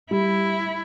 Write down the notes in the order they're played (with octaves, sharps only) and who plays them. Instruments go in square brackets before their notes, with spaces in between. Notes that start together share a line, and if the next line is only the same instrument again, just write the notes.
[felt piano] G3 [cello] E4